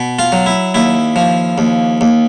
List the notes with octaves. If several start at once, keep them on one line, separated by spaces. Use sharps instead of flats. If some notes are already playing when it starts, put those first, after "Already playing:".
Already playing: B2
F4
F#3
E4
D#2 E4
F3
D#2
D#2